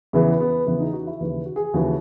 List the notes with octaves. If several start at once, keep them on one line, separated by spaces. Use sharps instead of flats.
E2 C#3 E3 B3
B3
E2 C#3 E3 B3
D#4
F#4
E4
D#2 C#3 E3 B4
F#4
G#4
D#2 C#3 E3 F#4